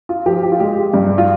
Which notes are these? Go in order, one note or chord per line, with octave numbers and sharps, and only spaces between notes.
F4
F3 G4
G4
F4
G#3 G4
G2
F4